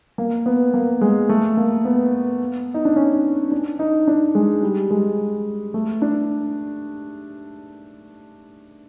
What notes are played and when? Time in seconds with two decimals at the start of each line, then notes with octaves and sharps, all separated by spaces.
0.18 A#3
0.46 B3
0.74 A#3
1.01 G#3
1.29 A3
1.57 A#3
1.85 B3
2.74 D#4
2.85 D4
2.96 C#4
3.52 D4
3.79 D#4
4.07 D4
4.35 G#3
4.63 G3
4.90 G#3
5.74 A3
6.02 D4